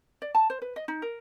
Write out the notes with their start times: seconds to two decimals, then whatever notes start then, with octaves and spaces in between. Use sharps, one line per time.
0.22 D5
0.35 A5
0.50 C5
0.62 B4
0.76 D#5
0.88 D#4
1.02 A#4